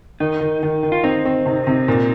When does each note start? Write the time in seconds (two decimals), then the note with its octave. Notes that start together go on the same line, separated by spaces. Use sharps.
0.20 D#3 D#4
0.41 D#3
0.63 D#3
0.83 D#3
0.92 F4
1.04 C4 D#4
1.25 C4
1.46 C3
1.67 C3
1.88 A#2